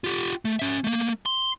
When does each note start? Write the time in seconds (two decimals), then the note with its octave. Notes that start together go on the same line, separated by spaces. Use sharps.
0.04 F4 G4
0.45 A3
0.59 C#4 E5
0.84 A3 A#3
1.26 C6